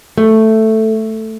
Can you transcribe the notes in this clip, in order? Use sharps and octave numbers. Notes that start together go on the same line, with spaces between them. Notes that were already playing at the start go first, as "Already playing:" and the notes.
A3